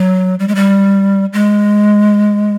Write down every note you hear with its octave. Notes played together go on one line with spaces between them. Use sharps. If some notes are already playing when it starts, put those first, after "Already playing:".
Already playing: F#3
G3
G#3
G3
G#3